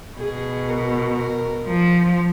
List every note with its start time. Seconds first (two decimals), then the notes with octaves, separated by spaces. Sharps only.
0.18 B2 G#4
0.68 A#4
1.17 A#4
1.67 F3